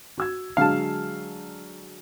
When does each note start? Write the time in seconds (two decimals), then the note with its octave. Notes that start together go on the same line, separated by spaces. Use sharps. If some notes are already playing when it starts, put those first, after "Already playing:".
0.18 F#4 E6 G#6
0.57 D3 F#3 G#3 F5 A5